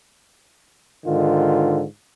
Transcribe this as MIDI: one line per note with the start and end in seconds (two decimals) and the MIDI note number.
1.06 1.84 44
1.06 1.84 50
1.06 1.84 51
1.06 1.84 65